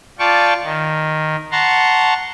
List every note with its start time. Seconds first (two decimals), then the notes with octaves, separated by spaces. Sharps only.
0.19 F4 D5 G5 A5 C#6
0.63 D#3
1.52 F#5 A5 A#5 C6 C#6